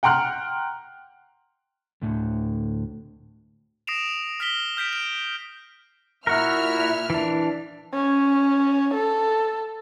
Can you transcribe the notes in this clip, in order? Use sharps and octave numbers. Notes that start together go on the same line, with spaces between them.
F#5 G5 A#5 C6 F6 F#6
D2 A2 D3
D#6 A#6 C7 D7 E7 F7
F6 A#6 B6 G7
F6 G6 B6 D7
D7
A#2 E4 F#4 A#4 E5 F6
E3 D4
C#4
A4